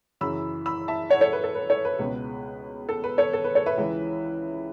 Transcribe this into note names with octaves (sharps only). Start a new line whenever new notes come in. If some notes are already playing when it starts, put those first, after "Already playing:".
F#2 C#3 E3 B5 E6
B5 E6
E5 A5
C#5 F#5
A4 C#5
B4
A4
B4
A4 C#5
B4
C#2 B2
A4
B4
A4 C#5
A4
B4
A4 C#5
B4 E5
C#2 C#3 E3